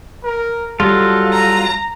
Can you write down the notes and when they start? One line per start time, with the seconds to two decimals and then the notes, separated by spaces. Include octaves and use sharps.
0.24 A#4
0.80 F#3 G3 F4 A4
1.31 A#5